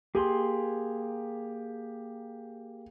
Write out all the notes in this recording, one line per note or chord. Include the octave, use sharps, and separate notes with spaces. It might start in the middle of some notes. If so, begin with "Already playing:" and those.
A#3 G4 G#4 C6